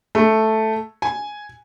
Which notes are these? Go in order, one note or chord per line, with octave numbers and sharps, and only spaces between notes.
A3
G#5